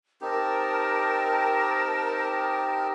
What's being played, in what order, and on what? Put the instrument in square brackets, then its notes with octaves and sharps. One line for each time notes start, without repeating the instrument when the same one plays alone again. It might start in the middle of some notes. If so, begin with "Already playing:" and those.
[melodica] C4 D#4 G4 [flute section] A#4 A5